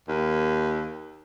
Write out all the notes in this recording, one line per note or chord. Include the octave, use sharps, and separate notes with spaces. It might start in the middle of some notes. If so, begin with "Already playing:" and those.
D#2